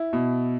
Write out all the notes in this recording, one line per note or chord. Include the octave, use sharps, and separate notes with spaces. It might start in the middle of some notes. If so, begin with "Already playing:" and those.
Already playing: E4
B2